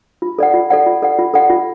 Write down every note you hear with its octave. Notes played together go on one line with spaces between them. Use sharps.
F4
A4 D5 F#5
F4
A4 D5 F#5
F4
A4 D5 F#5
F4
A4 D5 F#5
F4